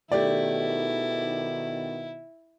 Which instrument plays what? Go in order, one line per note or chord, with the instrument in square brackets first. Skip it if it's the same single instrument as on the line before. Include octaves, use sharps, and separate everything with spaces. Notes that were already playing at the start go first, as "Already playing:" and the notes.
[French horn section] B2 D#3 [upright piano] A3 G4 D5 [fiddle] E4